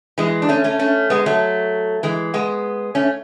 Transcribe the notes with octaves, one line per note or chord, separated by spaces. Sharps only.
E3 G#3
D4
A3 C#4
A3 C#4
A3 C#4
G#3 B3
F#3 A3
E3 G#3
G#3 B3
A3 C#4